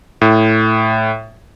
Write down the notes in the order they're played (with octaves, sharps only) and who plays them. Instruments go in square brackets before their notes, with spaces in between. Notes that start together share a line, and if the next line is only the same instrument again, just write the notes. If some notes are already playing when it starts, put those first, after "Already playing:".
[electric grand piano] A2